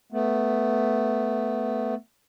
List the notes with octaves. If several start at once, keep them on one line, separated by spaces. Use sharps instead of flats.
A3 B3